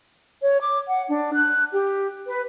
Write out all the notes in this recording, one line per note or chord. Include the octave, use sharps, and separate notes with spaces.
C#5
D6
F#5
D4
F#6
G4
B4